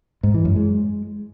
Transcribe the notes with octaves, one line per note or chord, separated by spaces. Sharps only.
G#2
E3
F#2
G#3